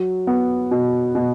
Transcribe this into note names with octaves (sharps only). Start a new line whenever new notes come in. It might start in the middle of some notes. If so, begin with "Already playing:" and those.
Already playing: F#3
B3
B2
B2